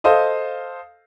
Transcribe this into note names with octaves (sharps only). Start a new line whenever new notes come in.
A4 C5 D#5 F5 D#6